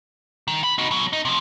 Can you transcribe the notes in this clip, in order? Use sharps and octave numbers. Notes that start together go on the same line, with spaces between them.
D#3
B5
D#4 F#4
B2 F#3
D#4
C3 F3